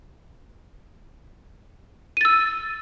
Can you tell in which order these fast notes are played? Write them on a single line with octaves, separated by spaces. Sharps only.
D#7 A6 E6